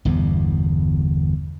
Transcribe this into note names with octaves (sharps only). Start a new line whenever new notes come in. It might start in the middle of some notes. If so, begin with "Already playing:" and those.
G1 E2 G2 B2